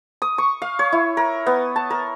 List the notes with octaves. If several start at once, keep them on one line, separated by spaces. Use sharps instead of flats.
D#6
C#6
F5
C#5
E4
A#4
B3
A5
A#4